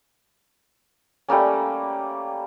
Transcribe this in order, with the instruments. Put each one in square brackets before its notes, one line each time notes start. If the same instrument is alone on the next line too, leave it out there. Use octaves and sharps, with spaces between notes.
[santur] G3 A3 A#3 C#4